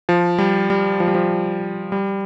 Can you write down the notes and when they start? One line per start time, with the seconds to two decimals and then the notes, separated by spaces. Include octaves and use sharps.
0.09 F3
0.38 G3
0.70 G3
1.00 F3
1.07 G3
1.15 F3
1.92 G3